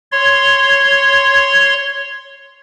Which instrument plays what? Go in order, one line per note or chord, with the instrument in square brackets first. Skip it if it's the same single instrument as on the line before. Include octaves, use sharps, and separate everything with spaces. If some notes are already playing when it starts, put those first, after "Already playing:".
[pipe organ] C#5 C6